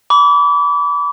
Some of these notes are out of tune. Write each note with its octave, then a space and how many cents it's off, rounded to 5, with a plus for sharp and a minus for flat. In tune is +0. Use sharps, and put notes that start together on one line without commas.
B5 +0 D6 -35